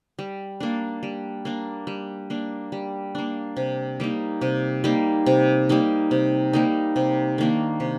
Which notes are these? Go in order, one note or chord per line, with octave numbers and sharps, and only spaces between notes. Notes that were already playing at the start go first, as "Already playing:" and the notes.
G3
A#3 D4
G3
A#3 D4
G3
A#3 D4
G3
A#3 D4
C3
G3 A#3 D#4
C3
G3 A#3 D#4
C3
G3 A#3 D#4
C3
G3 A#3 D#4
C3
D#3 A#3 D4
C3